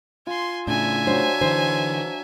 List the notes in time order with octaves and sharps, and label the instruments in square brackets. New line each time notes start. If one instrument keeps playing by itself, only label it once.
[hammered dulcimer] F4 [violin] G#5 C6
[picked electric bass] A2 C#3 [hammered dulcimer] D4 [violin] E5 G#5
[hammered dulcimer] F#3 D4 [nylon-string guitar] C5
[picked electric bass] D3 E3 [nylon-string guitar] C5